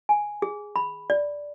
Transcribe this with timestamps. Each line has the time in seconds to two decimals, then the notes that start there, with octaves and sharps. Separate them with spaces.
0.09 G#5
0.42 G#4
0.76 B5
1.10 D5